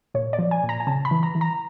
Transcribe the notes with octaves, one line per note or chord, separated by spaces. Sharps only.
A#2 C#5
D5
F3
G#5
A#2
A#5
G#5
C#3 A5
B5
E3
A#5
E3
A#5